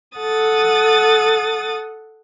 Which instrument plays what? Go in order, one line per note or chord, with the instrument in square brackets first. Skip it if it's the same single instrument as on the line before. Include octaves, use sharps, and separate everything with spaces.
[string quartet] A4 F#5 D#6 A6